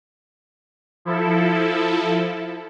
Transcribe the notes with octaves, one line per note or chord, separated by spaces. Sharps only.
F3 E4 A4